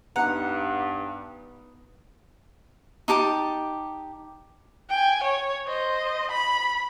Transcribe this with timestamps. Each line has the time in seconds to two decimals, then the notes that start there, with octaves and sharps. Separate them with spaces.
0.16 G2 B3 D#4 F#5 A#5
3.08 D#4 G4 A5 D6
4.90 G5 G#5
5.23 C#5
5.67 C5 D#5
6.31 B5